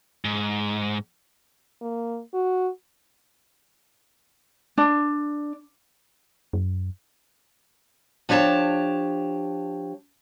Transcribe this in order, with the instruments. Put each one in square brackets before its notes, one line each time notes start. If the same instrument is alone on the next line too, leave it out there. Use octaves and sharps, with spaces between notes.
[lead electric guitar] G#2
[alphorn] A#3
F#4
[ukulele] D4
[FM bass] F#2
[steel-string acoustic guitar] F3 D4 G4 C#5 A5